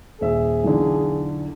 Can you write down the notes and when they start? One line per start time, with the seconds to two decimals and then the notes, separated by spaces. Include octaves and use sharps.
0.21 D#1 G#4 E5 E6
0.64 B1 E2 D3